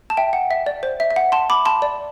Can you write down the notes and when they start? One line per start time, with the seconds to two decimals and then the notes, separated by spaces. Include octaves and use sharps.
0.10 A5
0.17 E5 G5
0.33 F#5
0.51 E5
0.66 D5
0.83 C5
1.00 E5
1.11 E5
1.16 F#5
1.32 A5 C6
1.50 B5 D6
1.66 A5 C6
1.82 D5